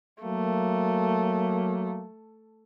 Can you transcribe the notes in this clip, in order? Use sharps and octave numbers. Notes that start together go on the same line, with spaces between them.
F#3 A3 A#3